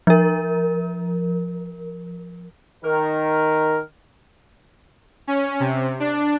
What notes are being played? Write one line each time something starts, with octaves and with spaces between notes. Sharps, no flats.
F3 A#4
D#3 A#4
C#4
C3
D4